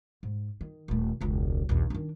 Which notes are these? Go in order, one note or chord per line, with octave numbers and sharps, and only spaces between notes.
G#2
D#3
D#1 A3
E1 C#2
A#1 D#2
D#3 D4